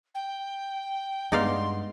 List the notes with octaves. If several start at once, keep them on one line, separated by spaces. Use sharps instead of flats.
G5
G2 G#3 B3 D#4 D5 F5 C6